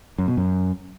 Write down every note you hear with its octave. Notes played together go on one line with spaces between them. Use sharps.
F#2
B2
F#2